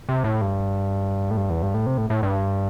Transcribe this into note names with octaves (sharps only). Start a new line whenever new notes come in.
C3
A2
G2
A2
G2
E2
G2
A2
C3
A2
A2
G2